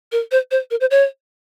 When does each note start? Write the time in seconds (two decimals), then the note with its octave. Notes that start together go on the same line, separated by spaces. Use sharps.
0.12 A#4
0.32 C5
0.51 C5
0.71 A#4
0.81 C5
0.91 C#5